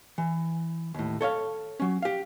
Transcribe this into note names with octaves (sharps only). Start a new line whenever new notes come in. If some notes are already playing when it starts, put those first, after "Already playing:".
E3
D#2 A2
A4 C#5 E5 F5
F#3 C#4
G4 F5